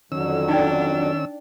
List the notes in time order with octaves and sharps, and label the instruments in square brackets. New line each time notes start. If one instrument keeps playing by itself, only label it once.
[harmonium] F2 D3 F#3 [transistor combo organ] D#3 C#4 E6
[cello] D4 [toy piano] D#4 D5 G5